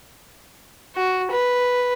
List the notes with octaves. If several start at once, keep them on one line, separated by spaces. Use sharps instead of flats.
F#4
B4